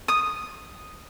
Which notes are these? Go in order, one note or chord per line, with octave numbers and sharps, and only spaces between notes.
D#6